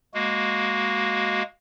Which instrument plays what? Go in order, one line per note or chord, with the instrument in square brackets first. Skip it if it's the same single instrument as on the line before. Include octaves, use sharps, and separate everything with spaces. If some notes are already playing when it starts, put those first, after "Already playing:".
[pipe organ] G#3 A#3 F#4